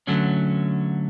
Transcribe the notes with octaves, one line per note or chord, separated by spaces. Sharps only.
D3 F#3 A3 C#4